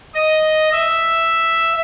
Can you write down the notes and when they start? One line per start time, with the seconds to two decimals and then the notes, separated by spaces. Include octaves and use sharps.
0.14 D#5
0.72 E5